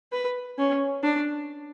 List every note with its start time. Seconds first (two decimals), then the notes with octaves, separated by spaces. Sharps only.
0.12 B4
0.58 C#4
1.03 D4